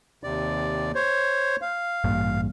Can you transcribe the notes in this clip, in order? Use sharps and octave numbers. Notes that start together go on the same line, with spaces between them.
D#2 C3 D5
C5 C#5
F5
A1 G2 A#2